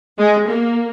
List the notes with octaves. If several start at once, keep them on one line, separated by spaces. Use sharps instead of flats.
G#3
A#3